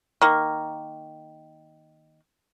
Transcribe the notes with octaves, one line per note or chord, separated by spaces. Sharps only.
D#3 A#3